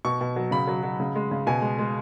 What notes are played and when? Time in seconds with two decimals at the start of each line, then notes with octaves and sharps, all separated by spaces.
0.05 B2 C#6
0.21 B2
0.36 F#3
0.51 C#3 B5
0.67 F#3
0.83 F#3
1.00 C#3
1.15 G#3
1.31 C#3
1.47 B2 G#5
1.62 G#3
1.79 G#3